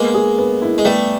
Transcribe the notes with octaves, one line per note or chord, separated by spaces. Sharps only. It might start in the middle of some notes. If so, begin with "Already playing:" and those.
Already playing: G#3 A#3 B3
G#4
B3
E4
G#3
G3 A3 B3